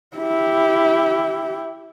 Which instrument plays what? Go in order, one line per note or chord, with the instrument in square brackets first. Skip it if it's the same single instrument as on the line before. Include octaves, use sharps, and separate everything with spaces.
[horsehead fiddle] E4 G4